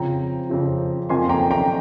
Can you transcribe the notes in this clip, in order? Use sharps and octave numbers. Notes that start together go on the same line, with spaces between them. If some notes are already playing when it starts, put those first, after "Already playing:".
Already playing: F2 C#3 F3 C4 F4 G5 A#5
F2 C#3 F3 C4 F4
F2 D#3 A#3 F4 G#5 C6
G5 A#5
G5 A#5